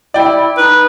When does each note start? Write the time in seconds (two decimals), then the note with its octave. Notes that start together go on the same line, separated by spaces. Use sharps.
0.14 E4 D5 G5
0.57 D#4 B4